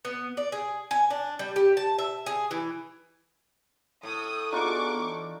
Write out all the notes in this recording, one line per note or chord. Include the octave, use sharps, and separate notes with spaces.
B3
D5
G#4
G#5
D4
G3
G4
A5
E5
G#4
E3
A2 D#6
B3 D4 D#4 F4 F#4 G#4 C#6 D6
E3